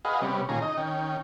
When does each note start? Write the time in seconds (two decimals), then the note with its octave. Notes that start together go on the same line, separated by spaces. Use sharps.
0.05 F#4 G#4 B4 D#5 F5
0.22 C3 G3 B3 C#4
0.49 A#2 D#3 C#4 F4 G#4 A#5
0.62 D#4 D#5
0.77 D#3 C#4 G5